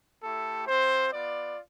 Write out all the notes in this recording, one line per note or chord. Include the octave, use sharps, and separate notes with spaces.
A3 E4 G4 A4
C4 F4 C5
B3 F4 D5